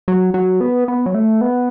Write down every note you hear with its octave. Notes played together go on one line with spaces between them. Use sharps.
F#3
F#3
B3
B3
F#3
A3
B3